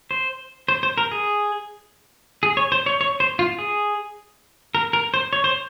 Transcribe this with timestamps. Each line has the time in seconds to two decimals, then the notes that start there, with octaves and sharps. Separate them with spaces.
0.11 C5
0.68 C5
0.83 C5
0.98 A#4
1.12 G#4
2.43 G#4
2.57 C#5
2.72 C5
2.86 C#5
3.01 C#5
3.20 C5
3.39 F4
3.59 G#4
4.75 A#4
4.93 A#4
5.14 C5
5.33 C#5
5.44 C5